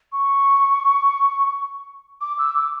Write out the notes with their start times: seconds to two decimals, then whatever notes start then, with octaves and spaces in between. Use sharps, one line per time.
0.12 C#6
2.21 D6
2.39 E6
2.55 D6